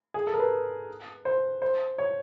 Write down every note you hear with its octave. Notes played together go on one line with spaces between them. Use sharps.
G#4
A4
A#4
B4
C5
C5
C#5